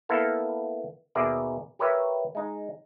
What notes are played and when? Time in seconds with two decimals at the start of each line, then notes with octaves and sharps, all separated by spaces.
0.09 A#3 B3 E4 A4 F5
1.15 D#2 B2 G#4 A#4 D5 E5
1.79 G4 A#4 B4 C#5 E5
2.35 G#3 D#4